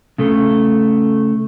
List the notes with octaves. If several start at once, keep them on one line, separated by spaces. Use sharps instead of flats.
C#3 A3